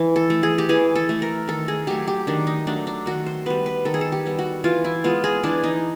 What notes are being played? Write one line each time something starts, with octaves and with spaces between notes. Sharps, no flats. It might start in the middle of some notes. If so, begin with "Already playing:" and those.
Already playing: E3
A4
A3
G#4
G4
E3 G#4
A4
A3
A#4
D#3 A4
G#4
F#3 A3 G4
G4
D#3 D4
D#4
F#3 A3 D4
D4
D#3 F#4
C5
G3 B3 B4
B4
D#3 A4
G#4
A4
G4
G3 B3
F#4
E3 F4
E4
G#3 B3 F4
G#4
E3 D4
D#4